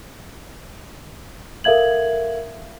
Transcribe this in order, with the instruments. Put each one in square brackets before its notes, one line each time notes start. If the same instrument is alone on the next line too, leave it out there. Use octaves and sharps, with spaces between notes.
[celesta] A4 A#4 E5 F5 G#6 F#7